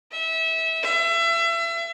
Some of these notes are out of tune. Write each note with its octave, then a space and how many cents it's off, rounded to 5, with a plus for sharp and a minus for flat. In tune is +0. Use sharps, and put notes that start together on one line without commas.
E5 -25
E5 +30